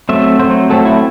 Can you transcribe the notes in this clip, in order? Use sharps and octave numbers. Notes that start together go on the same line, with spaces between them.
F#3 A3 C4 E5
F#3 A3 C4 C5
F#3 A3 C4 A4
E4